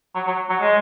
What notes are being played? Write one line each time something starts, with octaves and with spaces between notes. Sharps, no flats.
F#3
F#3
F#3
G#3